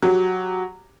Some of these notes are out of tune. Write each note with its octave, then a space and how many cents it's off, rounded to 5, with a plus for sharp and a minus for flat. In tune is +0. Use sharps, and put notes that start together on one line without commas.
F#3 -5 G4 +0